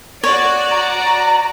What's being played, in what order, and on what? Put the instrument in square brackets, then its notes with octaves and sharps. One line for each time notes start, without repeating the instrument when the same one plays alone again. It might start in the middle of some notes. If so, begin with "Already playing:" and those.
[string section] F#4 D5 [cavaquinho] C#5
[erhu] A#5